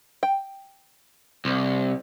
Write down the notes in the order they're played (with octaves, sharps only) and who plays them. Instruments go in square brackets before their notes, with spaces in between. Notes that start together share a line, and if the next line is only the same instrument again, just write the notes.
[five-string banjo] G5
[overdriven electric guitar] C2